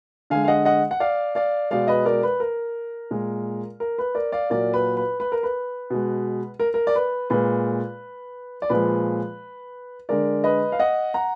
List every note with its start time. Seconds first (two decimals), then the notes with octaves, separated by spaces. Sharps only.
0.30 D3 G#3 F5 G#5
0.44 F5
0.48 D#5 F#5
0.65 D#5 F#5
0.91 F#5
1.00 D5 F5
1.35 D5 F5
1.71 B2 G#3 D5 F5
1.88 B4 D#5
2.06 A#4 D5
2.23 B4
2.40 A#4
3.11 A#2 G#3
3.80 A#4
3.98 B4
4.15 A#4 D5
4.32 D5 F5
4.50 A#2 F#3 A#4 D5
4.74 B4
4.97 B4
5.20 B4
5.32 A#4
5.43 B4
5.90 B2 G#3
6.60 A#4
6.74 A#4
6.87 D5
6.95 B4
7.30 A#2 G#3 B4
8.62 D5
8.70 A#2 F3 G#3 B4
10.09 D3 G#3 A#4 D5
10.44 B4 D#5
10.72 F5
10.79 D#5 F#5
11.14 F#5 A#5